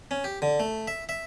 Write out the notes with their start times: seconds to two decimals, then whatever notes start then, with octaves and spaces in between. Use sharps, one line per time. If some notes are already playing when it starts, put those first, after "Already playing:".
0.11 C#4
0.24 G4
0.42 D3
0.60 A3
0.87 E5
1.09 E5